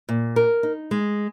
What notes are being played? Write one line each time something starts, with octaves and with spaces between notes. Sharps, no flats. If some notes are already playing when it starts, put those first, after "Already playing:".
A#2
A#4
D#4
G#3